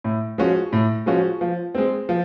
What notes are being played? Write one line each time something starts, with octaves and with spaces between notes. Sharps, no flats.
A2
F3 G#3 C#4 F#4
A2
F3 G#3 C#4 F#4
F3
G#3 C4
F3